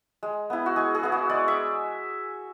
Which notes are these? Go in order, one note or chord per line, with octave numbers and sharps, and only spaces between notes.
G#3
B3 E4
F#4
G#3 G#4
G#4
B3 E4
F#4
G#3 D5
E5